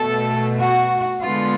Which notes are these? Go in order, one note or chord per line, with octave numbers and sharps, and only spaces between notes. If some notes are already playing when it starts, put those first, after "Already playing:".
Already playing: B2 A3 A4
F#4
D3 G#3 B3 F4